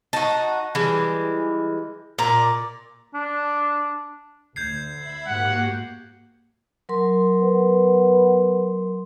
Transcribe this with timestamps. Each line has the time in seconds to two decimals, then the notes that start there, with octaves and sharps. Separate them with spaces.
0.13 D#4 F#4 A5
0.75 E3 G3 G#3
2.18 A#2 D5 A#5
3.14 D4
4.56 D2 G6 G#6 C7
4.95 E5 B5
5.27 G#2 A#3 F#4 G4 F#5
6.89 F#3 A#4 C6
7.41 B3